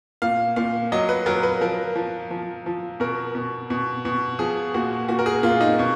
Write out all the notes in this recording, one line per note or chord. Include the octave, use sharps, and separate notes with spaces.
A#2 F5
A#2 F5
F#3 D#5
B4
F#3 A#4
B4
F3 A#4
F3
F3
F3
B2 A#4
B2
B2
B2
F3 G#4
A#2 F#4
A#2 F#4
A#4
G#4
A#2 F4
D#4
B2